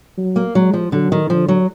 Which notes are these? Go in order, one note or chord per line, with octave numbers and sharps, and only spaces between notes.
F#3
A#3
F#3 G#3
F3
D3 F#3
D#3
D3 F3
F#3